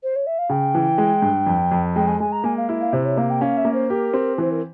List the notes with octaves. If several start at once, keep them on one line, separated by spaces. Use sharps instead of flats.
C5
C#5
E5
F5
C#3 G5
E3
G#3
G2
F2
F2
G#3 G5
G#5
G#3 G#5
A#5
A#3 G#5
F5
E4
F5
C3 C5
C#5
A#3 F5
G5
C#4 F5
E5
A#3
C5
G4 A#4
C4
E3 C5
A#4